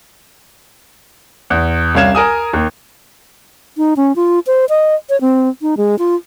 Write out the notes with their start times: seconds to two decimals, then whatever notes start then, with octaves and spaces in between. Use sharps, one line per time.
1.50 E2
1.95 C2 C#4 F5 G#6 E7
2.15 A#4 G#5 D#6
2.53 D#2
3.77 D#4
3.97 C#4
4.16 F4
4.47 C5
4.69 D#5
5.10 C#5
5.21 C4
5.62 D#4
5.77 G#3
5.99 F4